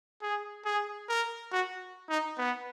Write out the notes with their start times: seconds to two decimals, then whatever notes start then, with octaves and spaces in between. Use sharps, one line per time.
0.22 G#4
0.65 G#4
1.09 A#4
1.52 F#4
2.10 D#4
2.38 B3